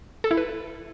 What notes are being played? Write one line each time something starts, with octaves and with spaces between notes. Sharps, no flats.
A4
E4
B4